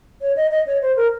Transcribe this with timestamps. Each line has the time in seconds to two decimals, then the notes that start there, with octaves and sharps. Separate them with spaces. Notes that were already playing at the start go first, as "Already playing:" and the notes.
0.21 C#5
0.36 D#5
0.51 D#5
0.67 C#5
0.82 C5
0.97 A#4